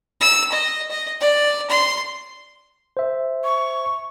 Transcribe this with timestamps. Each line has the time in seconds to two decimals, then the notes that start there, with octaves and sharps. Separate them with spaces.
0.21 E6
0.52 D#5
0.91 D#5
1.21 D5
1.70 C6
2.97 C5 E5
3.44 C#6